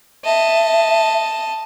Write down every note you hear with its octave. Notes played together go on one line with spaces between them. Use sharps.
D#5 E5 A5